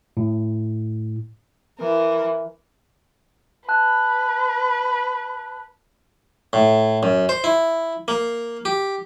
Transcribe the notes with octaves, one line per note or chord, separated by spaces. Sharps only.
A2
E3 A#4
B4 A5 F#6
A2
F#2
C5
E4
A#3
G4